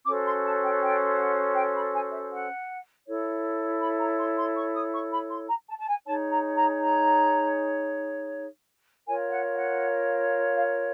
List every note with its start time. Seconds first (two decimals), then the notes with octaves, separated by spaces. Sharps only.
0.05 C#4 F#4 A4 C5 D6
0.24 C6
0.44 A5
0.63 G5
0.81 G5
1.18 F#5
1.55 G5
1.75 B5
1.94 G#5
2.12 E5
2.31 F#5
3.05 E4 A4 C#5
3.81 B5
3.99 A#5
4.18 C6
4.37 C6
4.55 C#6
4.74 D#6
4.93 C#6
5.12 B5
5.31 C6
5.49 A#5
5.68 A5
5.79 A5
5.87 G#5
6.05 D#4 G#4 C#5 A5
6.31 A#5
6.56 A#5
6.81 A#5
9.06 F4 A#4 C#5 G#5
9.31 F#5
9.55 F#5
10.55 F5